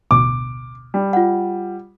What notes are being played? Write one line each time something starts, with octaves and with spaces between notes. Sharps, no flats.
A1 D2 B2 D6
G3
F4 F#5